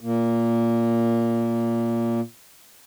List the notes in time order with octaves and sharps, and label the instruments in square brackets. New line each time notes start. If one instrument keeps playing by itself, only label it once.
[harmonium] A#2 A#3